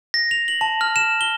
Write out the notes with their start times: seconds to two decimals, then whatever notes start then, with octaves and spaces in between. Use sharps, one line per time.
0.14 A#6
0.31 F7
0.48 F#7
0.61 A5
0.81 F6
0.96 E7
1.21 G7